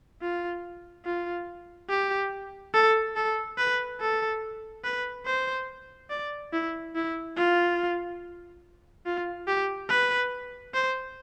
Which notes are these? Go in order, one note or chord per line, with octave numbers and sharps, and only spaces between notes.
F4
F4
G4
A4
A4
B4
A4
B4
C5
D5
E4
E4
F4
F4
G4
B4
C5